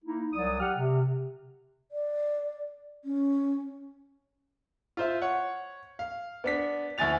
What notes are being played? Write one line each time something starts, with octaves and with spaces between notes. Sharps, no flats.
A#3 D#4 E4
C2 F#3 D5 D#6
G4 F#5 F6
C3
D5
C#4
F4 C5 E5
C#5 F#5
F5
B3 D4 B6
D2 E4 G#5 A6 F7